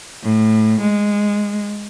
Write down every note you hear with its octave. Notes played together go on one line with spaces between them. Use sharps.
A2
G#3